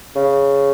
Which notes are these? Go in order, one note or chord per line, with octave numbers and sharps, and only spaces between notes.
C#3